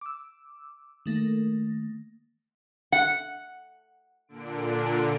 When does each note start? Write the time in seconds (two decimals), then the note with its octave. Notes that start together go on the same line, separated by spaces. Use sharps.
0.01 D6 E6
1.06 D#3 A3 A#3
2.92 F#5
4.28 A#2 D3 D7